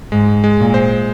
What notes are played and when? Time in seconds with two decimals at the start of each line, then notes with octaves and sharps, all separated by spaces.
0.12 G#2 G#3
0.44 G#3
0.59 A#2
0.74 C5